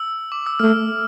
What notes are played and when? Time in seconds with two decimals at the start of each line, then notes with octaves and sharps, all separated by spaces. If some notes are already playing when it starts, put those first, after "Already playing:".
Already playing: E6
0.32 D6
0.47 E6
0.59 A3 F6